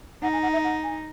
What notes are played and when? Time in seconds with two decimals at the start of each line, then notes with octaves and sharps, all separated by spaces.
0.23 D#4 F#5
0.33 G#5
0.43 F#5
0.53 E5
0.64 F#5
0.84 G#5